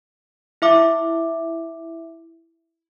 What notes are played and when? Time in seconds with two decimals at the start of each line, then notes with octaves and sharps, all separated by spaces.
0.62 E4 E5 D6